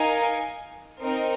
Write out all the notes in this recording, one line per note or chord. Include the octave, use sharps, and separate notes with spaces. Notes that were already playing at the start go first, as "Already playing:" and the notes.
Already playing: D#4 A#4 F5 G#5
C4 D#4 A#4